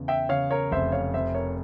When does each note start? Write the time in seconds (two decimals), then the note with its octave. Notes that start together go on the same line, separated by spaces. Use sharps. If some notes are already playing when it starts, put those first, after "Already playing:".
Already playing: E2 C#3
0.08 E5 G5
0.29 C#3 C#5 F5
0.51 A#4 C#5
0.71 F1 C5 E5
0.92 C#5 F5
1.14 F2 C5 E5
1.34 A#4 C#5